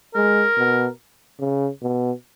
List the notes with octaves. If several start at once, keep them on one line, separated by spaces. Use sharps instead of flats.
G#3 A#4
B2
C#3
B2